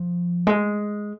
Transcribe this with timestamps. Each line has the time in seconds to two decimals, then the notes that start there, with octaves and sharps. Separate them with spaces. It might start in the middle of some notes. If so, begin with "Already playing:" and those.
Already playing: F3
0.47 G#3